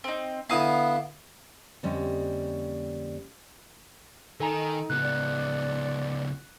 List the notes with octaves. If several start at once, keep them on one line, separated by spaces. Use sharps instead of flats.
C4 D#4
D3 B3 E4 F5 A5 A#5 D#6
F2 D3 G3 A#3 C#4 D#5
D#3 D#4 A4 G#5 A#5
C#2 B3 F#6
D5